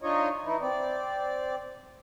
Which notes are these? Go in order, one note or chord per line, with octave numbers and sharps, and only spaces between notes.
D4 D#4 F4 C#5 D#5
E3 D#4 E4
C4 D5